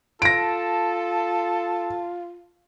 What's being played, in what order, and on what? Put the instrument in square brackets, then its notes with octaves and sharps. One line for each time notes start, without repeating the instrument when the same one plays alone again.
[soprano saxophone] F4 [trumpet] A4 [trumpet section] A5 [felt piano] A#6 D7